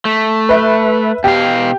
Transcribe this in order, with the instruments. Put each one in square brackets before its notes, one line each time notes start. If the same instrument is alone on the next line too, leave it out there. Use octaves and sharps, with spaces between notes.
[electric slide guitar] A3
[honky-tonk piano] B4 E5
[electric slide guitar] B2 F5 [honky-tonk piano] G4